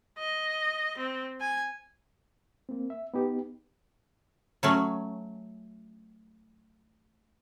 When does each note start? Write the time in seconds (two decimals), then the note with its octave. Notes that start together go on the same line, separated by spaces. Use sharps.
0.19 D#5
0.98 C4
1.41 G#5
2.69 A#3 C4
2.90 E5
3.14 B3 D#4 G4
4.63 F#3 A3 C#4